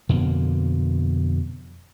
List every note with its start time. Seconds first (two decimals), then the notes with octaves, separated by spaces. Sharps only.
0.09 F2 B2 D3 A#3